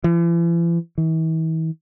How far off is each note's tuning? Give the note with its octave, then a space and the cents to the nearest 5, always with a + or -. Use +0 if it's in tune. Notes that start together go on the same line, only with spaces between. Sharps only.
E3 +45
E3 -40